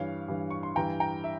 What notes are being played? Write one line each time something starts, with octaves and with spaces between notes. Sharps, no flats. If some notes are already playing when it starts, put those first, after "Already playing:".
Already playing: G2 E3 C#5 F5
G2 E3
C#6
C6
G2 E3 G5 A#5
G5 A#5
E5